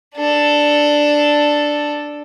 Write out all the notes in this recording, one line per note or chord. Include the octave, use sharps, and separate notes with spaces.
D4 A4